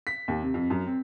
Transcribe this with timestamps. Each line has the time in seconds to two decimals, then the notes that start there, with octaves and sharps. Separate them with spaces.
0.07 B6
0.28 D#2
0.42 C3
0.54 F2
0.70 F#2
0.86 C4